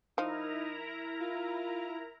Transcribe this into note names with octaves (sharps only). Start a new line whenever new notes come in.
F3 D#4 E4 A#4 A#5
F4